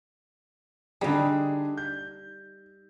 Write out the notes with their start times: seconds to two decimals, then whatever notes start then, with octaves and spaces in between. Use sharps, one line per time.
1.01 D3 G3 D4 D#4 G#4
1.77 G6